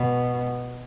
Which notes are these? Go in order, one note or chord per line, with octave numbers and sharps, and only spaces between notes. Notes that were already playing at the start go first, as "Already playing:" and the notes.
Already playing: B2